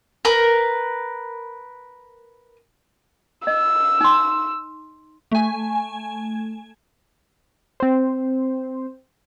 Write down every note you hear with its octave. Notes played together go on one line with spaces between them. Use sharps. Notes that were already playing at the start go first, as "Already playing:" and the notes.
A#4 B4
D#5 E6
D#4 C6
A3 G#5
C4 C5